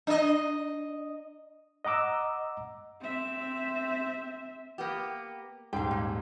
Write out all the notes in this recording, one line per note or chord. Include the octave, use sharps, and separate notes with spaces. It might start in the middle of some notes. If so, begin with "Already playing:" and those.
D4 D#5
D#5 F#5 A#5 D6 E6
C4 E5
A#3 B3 G4
D#1 G#2 F5 G5
A#3